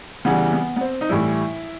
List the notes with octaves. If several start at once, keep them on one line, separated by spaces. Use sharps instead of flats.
C#3 E3 G3 B3
B3
B3
C4
D#4
A2 E3 G3 E4